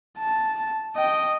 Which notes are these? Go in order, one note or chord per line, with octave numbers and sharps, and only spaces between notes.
A5
D#5 G5